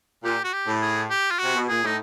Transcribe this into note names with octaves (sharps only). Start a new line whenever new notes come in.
A#2 G4
F#4
G4
A2
G#4
G4
F4
C3 F#4
B2
A#2 G#4
A2 D#4